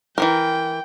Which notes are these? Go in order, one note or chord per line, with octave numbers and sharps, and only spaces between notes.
E3 F3 A#4 G5